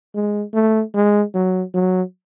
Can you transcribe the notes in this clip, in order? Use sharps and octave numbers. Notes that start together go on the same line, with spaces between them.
G#3
A3
G#3
F#3
F#3